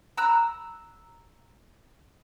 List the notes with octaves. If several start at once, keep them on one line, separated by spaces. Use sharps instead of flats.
A#5 E6 F#6